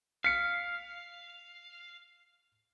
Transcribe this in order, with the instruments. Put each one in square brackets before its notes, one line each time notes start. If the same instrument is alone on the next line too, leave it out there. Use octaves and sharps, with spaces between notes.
[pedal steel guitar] F5 [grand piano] B6 C#7